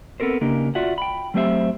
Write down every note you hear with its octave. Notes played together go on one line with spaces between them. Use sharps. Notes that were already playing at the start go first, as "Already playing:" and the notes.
B3 C4 A4 A#4 C5
C#3 A#3 D4 D#4 G4 A#4
F4 F#4 D5 E5 F#5
G5 B5
F#3 A3 C4 G4 C5 E5